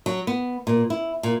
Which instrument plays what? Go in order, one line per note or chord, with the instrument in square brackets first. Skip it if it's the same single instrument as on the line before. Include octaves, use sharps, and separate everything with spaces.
[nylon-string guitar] F#3
B3
A#2
E4
A#2